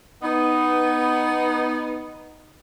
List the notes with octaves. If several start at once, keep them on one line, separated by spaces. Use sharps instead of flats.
B3 D#4